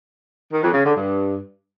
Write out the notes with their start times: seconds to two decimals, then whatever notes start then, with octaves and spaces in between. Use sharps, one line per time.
0.52 D#3
0.62 F2
0.73 C#3
0.84 D3
0.95 G2